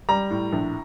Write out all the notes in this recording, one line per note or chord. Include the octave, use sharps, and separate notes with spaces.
G3 A#5
A2
A#1